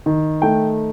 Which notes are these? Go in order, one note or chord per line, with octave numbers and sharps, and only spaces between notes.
D#3
A3 G5